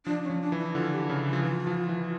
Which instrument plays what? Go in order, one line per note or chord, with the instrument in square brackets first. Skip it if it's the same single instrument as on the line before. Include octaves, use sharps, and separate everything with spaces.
[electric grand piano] F3 [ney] D4
[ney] C#4
[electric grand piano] F3
[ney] D4
[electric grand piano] E3
[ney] E4
[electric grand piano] D3 [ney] F4
[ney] G4
[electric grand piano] C#3 [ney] F4
[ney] E4
[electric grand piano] F3
[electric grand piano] E3 [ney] F4
[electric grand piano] F3
E3